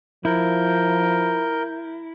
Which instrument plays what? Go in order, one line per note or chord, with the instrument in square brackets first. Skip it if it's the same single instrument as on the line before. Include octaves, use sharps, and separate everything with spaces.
[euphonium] F3 [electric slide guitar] E4 [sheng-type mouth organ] A#4 G6